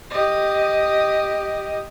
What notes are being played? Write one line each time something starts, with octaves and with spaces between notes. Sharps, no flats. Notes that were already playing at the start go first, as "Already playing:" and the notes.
G4 D#5